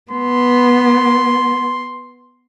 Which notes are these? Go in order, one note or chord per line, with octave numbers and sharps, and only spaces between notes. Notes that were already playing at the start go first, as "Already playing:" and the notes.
B3 C6